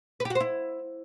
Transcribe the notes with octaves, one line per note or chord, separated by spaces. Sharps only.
B4
G4
F#4
C5
E4